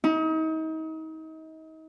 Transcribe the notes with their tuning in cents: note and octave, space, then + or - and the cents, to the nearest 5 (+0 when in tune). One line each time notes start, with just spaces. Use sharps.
D#4 +35